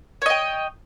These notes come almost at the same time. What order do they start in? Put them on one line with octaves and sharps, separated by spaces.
C#5 D#5 G5